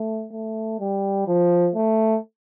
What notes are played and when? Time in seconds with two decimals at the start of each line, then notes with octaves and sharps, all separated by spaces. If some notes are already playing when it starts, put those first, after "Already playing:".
Already playing: A3
0.32 A3
0.80 G3
1.27 F3
1.75 A3